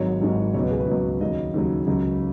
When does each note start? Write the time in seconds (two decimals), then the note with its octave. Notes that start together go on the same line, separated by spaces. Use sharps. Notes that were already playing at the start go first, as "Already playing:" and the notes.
Already playing: G#1 G#2 F#3 C#5
0.21 G#1 G#2 F#3
0.54 C#2 B2 F#3 C#5
0.63 B4
0.71 G#4
0.79 B4
0.88 C#2 B2 F#3
1.21 D#2 C#3 F#3 D#5
1.54 D#2 C#3 F#3
1.87 C#2 C#3 F#3